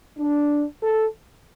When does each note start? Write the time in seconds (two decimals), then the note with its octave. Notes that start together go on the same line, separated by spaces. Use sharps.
0.18 D4
0.83 A4